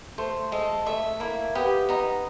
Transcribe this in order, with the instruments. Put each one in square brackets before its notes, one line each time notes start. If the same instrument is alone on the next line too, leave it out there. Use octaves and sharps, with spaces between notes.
[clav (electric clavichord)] A3 [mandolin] C5
[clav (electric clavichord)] G#3 [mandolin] A4
[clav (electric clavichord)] A3 [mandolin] E5
[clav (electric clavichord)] A#3 [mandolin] E4
[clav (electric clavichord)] B3 [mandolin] G4
[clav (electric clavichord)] B3 [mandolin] D#4